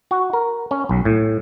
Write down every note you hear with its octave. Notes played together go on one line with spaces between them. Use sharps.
F#4
A#4
C#4
B1
A2